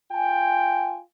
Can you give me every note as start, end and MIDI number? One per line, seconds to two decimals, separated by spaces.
0.12 1.00 65
0.12 1.00 79
0.12 1.00 80